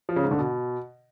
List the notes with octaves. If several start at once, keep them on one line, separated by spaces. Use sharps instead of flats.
F3
C#3
G#2
D3
B2